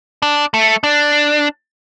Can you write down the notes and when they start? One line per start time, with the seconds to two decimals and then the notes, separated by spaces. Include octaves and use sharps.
0.22 D4
0.54 A3
0.84 D4